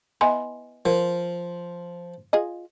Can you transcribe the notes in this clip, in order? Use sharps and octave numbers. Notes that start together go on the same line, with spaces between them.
B3 E4 D#5 G#5 C6
F3 A#4
F4 G#4 D#5